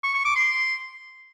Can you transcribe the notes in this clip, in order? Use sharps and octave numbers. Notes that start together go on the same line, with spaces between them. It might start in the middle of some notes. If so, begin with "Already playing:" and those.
C#6
C#6
D6
C6